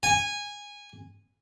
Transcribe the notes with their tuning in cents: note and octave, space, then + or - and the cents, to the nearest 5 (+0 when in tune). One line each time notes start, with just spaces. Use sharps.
G#5 -15